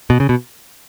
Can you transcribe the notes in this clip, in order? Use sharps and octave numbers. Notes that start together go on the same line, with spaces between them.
B2
C#3
B2